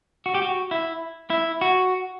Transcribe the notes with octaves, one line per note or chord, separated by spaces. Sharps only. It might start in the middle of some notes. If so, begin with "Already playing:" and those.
F#4
G4
F#4
E4
E4
F#4